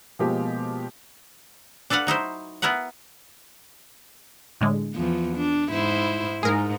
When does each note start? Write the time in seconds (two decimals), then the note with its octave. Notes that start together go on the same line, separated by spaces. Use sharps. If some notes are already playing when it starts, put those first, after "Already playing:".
0.19 B2 F3 G#3 A#3 G4
1.90 D4 A4 B4 F5 F#5
2.07 F#3 D#4 E4 C5
2.62 B3 E4 A#4 B4 F#5
4.61 A2 D3 G#3
4.95 E2 F3
5.36 D4
5.69 G#2 E4 C5
6.43 G#2 G#4 A#4